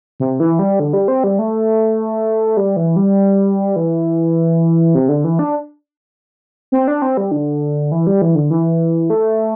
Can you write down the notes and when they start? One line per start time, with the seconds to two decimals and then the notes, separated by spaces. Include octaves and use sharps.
0.20 C3
0.40 E3
0.59 G3
0.80 D3
0.93 G3
1.08 C4
1.24 G3
1.39 A3
2.57 G3
2.76 E3
2.96 G3
3.76 E3
4.95 C3
5.09 D3
5.24 E3
5.39 D4
6.72 C4
6.88 D4
7.02 C4
7.17 G3
7.31 D3
7.92 E3
8.07 G3
8.22 E3
8.35 D3
8.50 E3
9.10 A3